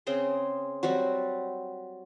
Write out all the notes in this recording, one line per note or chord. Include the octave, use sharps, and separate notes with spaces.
C#3 C4 G#4 C6
F#3 G3 C4 F#4